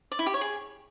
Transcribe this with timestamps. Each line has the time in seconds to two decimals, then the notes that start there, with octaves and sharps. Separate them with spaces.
0.12 D5
0.19 E4
0.26 G4
0.34 C#5
0.41 G#4